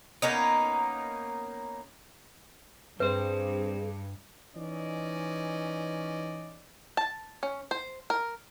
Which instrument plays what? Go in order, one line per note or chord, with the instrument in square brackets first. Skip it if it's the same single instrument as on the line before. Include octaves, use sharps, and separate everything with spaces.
[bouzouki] A#3 B3 C#4 D#4
[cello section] G2 [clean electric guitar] C4 C5 [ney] G#4 [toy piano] B4
[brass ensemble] E3 C#4 D#4 D5 D#5
[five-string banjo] A5
C#4
C5
A#4